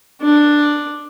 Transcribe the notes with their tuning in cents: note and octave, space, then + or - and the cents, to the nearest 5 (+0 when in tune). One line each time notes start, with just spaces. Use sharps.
D4 +5